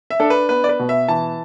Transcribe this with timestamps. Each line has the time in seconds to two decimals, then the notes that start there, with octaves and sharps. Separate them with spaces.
0.10 E5
0.20 D4 A4
0.30 B4
0.49 B3 B4
0.64 D5
0.69 B4
0.79 B2
0.89 E5
1.08 E3 A5